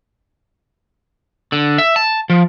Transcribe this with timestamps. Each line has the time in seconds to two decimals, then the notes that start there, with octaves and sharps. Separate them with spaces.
1.52 D3
1.78 E5
1.96 A5
2.30 F3